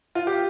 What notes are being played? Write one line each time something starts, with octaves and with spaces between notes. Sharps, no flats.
F4
G4